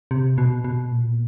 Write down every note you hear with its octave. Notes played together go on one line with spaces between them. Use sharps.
C3
B2
B2
A#2